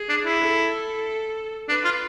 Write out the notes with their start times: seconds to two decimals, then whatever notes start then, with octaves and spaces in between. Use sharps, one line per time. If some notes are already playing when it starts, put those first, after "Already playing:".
Already playing: G#4
0.09 D4
0.26 E4
0.41 A4
1.69 D4 B4
1.85 F4